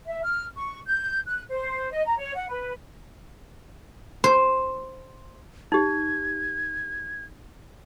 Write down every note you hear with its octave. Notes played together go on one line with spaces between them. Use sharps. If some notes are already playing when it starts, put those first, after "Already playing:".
E5
F6
C#6
G6
F#6
C5
D#5
A#5
C#5
F#5
B4
C5
D#4 G4 G#6